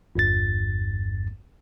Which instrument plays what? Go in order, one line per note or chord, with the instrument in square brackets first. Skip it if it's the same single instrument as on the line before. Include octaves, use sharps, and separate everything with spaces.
[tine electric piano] G1 E2 G2 A6